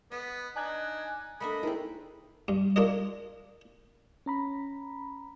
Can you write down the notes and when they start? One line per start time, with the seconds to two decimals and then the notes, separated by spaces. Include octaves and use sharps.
0.12 B3 D#5
0.56 D4 D#4 G#5 F#6 G#6
1.40 A3 A#3 D4 D#5 B5
1.63 G#3 C4 D#4 E4 A#4
2.48 G2
2.76 D4 F4 A4 A#4 D#5
4.26 C#4 A#5 B5